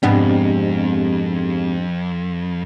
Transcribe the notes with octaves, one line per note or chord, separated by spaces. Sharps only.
F2 G#2 C3 B3 C4 D4 G4